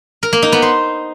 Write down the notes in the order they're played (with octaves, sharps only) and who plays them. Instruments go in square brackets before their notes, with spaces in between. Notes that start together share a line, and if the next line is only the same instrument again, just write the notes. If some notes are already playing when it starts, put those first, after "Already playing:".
[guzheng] A#4
A#3
D#4
B3
C5